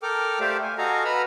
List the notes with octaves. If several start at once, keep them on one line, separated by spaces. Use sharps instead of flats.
A4 A#4 G5 D6 F6
A3 G4 C5 D5 E5 F5
G#5
F#4 A4 D#5 F5 G#5 A#5
B4 A#5 B5 E6 F6